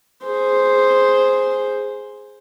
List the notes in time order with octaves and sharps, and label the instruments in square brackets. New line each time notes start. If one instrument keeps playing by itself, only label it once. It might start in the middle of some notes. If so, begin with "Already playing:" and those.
[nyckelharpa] G#4 C5